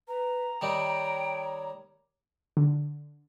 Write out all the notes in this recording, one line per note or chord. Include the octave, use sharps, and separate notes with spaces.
B4 A#5
D#3 G3 D#4 C#5 G5
D3